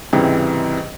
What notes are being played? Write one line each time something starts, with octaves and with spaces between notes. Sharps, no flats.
C#2 G#2 C3 E3 G3